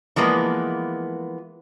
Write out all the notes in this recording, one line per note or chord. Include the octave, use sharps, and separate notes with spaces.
E3 F3 G#3 A#3 B3